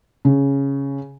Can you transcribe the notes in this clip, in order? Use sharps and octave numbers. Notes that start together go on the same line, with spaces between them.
C#3